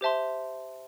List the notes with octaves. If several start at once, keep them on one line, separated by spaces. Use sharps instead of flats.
G4 C5 E5 A5 C6